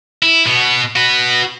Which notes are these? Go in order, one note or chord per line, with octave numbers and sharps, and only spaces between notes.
E4
B2 B3
F#4 B4